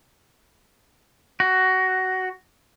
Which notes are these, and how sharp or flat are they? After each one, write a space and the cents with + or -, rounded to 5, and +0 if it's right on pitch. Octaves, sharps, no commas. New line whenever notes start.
F#4 +15